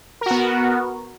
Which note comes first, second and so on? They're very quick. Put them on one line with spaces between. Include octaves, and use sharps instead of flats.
A#4 F#4 B3